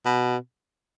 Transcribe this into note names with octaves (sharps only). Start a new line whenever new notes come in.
B2